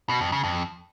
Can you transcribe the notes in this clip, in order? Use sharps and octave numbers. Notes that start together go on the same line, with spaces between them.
B2
F2
C#3
F2